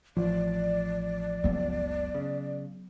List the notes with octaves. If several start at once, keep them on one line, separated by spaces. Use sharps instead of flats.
A1 F3 D5
F#1 C#2 F#3 B3
C#3